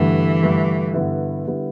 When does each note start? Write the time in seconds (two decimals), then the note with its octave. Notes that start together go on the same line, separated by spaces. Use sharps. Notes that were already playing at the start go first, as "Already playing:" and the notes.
Already playing: G2 D3 E3 A3
0.42 G2 D3 A3
0.94 G2 D3 G3 B3 E4
1.47 D3 G3 B3 E4